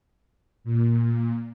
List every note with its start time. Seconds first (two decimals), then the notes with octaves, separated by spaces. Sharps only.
0.64 A#2